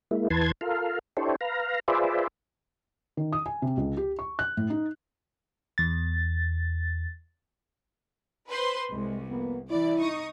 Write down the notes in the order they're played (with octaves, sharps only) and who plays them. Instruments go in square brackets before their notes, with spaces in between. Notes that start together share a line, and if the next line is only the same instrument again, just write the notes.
[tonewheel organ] G#3 A#3 E4
E2 E3 B4 A5 C6 G#6
F4 A4 A#4 F5
D4 E4 G4 A4 C5 C#5
B4 F5 A#5
F4 G#4 B4 C5 D5 E5
[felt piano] D#3
D#6
G#5
C3
C#2
G4
C#6
F#6
A2
D#4
[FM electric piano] E2 A6
[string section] B4 C5 C6
[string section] C2 [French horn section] G#3
[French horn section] F2 A#3 B3
[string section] E3 D5 [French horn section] E4
[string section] D#4 C#6 D#6